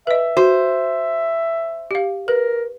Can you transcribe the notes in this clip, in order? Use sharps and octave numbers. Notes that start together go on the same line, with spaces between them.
B4 D#5 E5
F#4 C5
G4 F5
A#4 B4